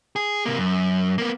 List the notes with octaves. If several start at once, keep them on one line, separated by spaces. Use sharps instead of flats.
G#4
C3 A#3
F#2
A#3 B3